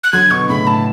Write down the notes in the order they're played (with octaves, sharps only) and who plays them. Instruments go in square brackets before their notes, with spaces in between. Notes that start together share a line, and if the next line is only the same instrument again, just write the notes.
[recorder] F#6
[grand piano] D3 F#3 [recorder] G#6
[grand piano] B2 D3 [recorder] C#6
[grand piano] A2 C#3 [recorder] B5
[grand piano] A2 [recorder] A5